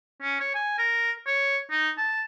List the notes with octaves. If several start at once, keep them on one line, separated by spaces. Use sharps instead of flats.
C#4
C#5
G#5
A#4
C#5
D#4
A5